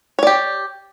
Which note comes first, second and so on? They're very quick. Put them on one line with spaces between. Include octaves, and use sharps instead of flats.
C#5 D5 G4